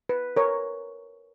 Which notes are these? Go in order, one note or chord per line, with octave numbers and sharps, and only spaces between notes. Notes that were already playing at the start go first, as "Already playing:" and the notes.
B4
A#4 C#5